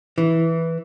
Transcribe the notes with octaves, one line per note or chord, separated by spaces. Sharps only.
E3